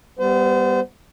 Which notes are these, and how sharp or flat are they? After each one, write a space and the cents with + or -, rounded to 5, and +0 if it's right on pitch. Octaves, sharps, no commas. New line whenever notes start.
G3 +0 B3 +0 C5 -35